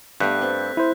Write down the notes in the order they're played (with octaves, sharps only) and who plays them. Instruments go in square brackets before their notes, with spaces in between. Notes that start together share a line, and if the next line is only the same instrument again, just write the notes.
[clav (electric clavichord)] G2 [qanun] A3 B3 G4 [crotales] F#6 G6 B6
[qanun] C4 A4
[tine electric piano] E4 C5